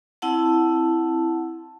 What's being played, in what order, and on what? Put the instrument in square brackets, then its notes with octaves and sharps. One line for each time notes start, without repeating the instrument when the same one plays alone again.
[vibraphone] C4 E4 F#5 A5